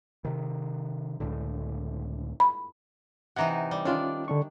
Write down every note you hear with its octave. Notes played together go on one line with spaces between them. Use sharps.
C3 D#3
C#2 A2 D3
B5
C3 E3 D#4 F#5 A#5
G3
D#3 C#4 D4 F4
D3 D4 C#6